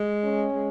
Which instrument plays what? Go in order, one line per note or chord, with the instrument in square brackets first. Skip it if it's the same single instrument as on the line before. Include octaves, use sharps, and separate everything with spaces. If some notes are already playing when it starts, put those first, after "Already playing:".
Already playing: [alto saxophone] G#3
[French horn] C#4
[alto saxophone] G#3